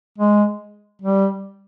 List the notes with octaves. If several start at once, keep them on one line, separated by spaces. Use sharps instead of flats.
G#3
G3